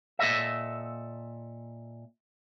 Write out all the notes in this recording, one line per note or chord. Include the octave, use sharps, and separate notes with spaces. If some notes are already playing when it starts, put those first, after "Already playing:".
A#2 A4 D#5 E5